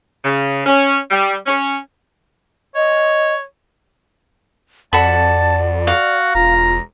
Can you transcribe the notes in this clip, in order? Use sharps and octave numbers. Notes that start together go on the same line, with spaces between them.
C#3
C#4
G3
C#4
C#5 D#5
F2 F#4 A4 D5 A5 B5
F#4 F5
E1 F4 A#5